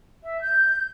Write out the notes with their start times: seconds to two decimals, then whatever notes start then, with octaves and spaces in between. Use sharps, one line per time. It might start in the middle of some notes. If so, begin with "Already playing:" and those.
0.24 E5
0.41 G6